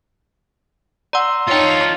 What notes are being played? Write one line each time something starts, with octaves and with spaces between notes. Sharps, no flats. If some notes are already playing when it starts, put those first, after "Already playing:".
D5 F#5 A#5 C6 E6
D#4 F4 A4 C#5 F5 G5